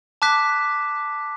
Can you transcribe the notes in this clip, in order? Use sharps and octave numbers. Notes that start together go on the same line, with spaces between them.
A5 D6 F#6 B6